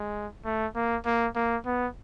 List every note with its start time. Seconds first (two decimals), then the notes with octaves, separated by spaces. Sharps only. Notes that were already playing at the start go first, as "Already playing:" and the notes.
Already playing: G#3
0.45 A3
0.76 A#3
1.06 A#3
1.36 A#3
1.66 B3